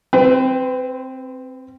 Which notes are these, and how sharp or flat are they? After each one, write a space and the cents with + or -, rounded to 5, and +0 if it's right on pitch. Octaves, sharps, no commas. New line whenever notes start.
C4 +0 B4 +40